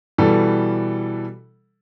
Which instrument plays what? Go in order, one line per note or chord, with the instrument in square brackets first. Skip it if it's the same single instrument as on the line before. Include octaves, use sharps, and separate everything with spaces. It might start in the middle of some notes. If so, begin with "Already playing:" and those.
[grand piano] B2 E3 G3 A4